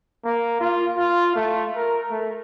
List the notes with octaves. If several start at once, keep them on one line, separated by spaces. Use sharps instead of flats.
A#3
F4
F4
A3
A#4
A3